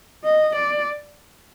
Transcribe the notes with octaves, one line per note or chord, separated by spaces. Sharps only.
D#5
D5